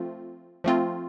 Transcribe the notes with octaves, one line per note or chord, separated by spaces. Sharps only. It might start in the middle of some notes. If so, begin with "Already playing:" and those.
Already playing: F3 A3 C4 F4
F3 A3 C4 F4